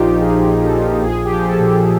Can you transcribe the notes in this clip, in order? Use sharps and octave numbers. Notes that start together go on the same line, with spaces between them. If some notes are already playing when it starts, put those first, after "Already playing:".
Already playing: A#1 A#2 F3 D#4 F4 G4
A#1 G#4
A#1
A4
F3
A#1 G#4
G4
F3
A4
A#2